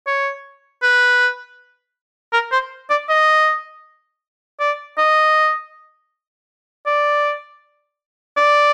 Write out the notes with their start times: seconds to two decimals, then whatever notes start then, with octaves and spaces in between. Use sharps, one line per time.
0.07 C#5
0.83 B4
2.33 A#4
2.52 C5
2.90 D5
3.09 D#5
4.60 D5
4.98 D#5
6.87 D5
8.37 D5